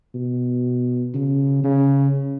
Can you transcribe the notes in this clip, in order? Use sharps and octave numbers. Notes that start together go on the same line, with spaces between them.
B2
C#3
C#3